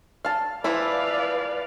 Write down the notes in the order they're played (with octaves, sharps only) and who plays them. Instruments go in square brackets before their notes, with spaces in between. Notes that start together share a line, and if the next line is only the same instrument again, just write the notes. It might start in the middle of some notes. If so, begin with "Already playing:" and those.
[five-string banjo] F5 A5
[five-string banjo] E3 F3 E4 [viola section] B4 D5 F5